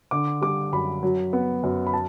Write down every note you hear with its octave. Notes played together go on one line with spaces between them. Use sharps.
D3 D6
G3 D6
F#2 B5
F#3
B3
F#2
B5
A5